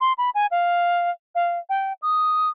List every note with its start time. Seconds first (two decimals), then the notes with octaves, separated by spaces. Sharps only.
0.01 C6
0.18 B5
0.35 G#5
0.51 F5
1.35 F5
1.69 G5
2.02 D#6